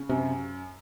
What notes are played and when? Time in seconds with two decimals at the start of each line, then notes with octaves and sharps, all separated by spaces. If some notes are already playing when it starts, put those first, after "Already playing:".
Already playing: C#3
0.09 F#2 C3